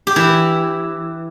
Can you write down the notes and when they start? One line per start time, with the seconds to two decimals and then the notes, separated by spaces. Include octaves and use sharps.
0.07 G4
0.16 E3 E4